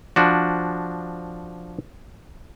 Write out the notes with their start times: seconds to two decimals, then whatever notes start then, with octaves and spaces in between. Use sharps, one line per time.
0.16 F3 D4 F#4